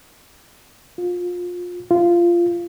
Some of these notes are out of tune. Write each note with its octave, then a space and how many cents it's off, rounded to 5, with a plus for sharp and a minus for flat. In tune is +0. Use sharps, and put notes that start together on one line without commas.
F4 +25
F4 -15